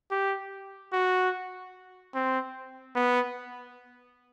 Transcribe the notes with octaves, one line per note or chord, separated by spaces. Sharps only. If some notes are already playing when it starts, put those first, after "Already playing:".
G4
F#4
C4
B3